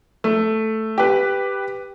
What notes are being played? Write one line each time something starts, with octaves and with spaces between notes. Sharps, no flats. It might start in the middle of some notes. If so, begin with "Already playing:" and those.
A3
G4 B4